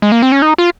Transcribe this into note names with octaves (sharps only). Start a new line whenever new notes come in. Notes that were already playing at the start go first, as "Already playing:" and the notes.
G#3
A#3
C4
C#4
D#4
F4